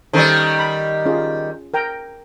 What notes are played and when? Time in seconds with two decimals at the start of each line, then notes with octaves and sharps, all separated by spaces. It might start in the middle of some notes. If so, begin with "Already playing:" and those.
0.13 D#3 G3 C#4 A4 C5
0.59 B5
1.06 C#4 F4 G#4
1.74 A#4 G5 A#5